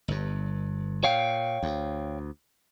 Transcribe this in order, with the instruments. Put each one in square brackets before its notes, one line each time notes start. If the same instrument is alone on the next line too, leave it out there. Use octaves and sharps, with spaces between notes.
[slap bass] G1 G2
[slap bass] A#2 [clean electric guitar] C#5 F5 G5
[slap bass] D2